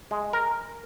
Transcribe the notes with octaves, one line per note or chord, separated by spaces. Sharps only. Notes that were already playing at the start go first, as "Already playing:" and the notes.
G#3
A#4